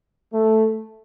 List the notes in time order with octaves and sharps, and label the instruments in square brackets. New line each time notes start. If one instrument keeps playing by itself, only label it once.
[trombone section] A3